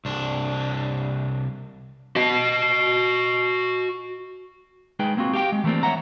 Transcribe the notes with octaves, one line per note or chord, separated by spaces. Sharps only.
C2 D4
F#4 D#5
G#3 D#4 G#4 B4 G5
A#3 C4 F4 F#4
G4 F5 G5
G#3
E3 A3 A#3 C4 D4
C#5 E5 F#5 A#5